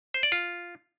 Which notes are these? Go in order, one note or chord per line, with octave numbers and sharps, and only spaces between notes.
C5
D5
F4